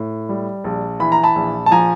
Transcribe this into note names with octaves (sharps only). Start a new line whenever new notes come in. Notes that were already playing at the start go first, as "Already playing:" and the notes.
Already playing: A2
G3
A#1
E3 B5
A#5
A5 B5
A#1
A5
F3 G#5 A#5